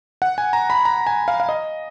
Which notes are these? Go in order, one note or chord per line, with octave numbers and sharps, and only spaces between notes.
F#5
G#5
A#5
B5
A#5
G#5
F5
F5
D#5